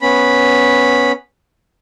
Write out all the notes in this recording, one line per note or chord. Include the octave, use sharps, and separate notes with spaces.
B3 C#4 B5